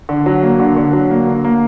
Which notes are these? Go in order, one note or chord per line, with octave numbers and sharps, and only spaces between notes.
D3
F#3
A#3
D3
D3
F#3
A#3
D3
A#3